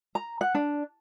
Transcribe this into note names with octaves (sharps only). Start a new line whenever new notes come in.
A#5
F#5
D4